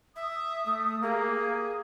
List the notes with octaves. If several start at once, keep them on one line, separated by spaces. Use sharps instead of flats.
E5 D#6
A3
A#3 G4 G#4